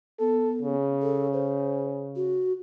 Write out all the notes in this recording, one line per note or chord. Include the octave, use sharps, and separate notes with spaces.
B3 A4
C#3
A4
C5
F#4